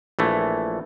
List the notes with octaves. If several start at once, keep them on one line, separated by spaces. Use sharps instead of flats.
A#1 E3 A3